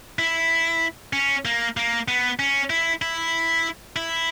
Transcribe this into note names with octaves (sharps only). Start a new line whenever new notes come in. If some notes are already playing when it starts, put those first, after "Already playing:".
E4
C#4
A#3
A#3
B3
C#4
E4
E4
E4